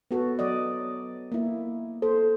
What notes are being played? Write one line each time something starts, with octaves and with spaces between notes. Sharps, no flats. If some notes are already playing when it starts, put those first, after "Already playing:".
B3 F#4 A4
F#3 D5 D#5
A#3 E4
A4 C5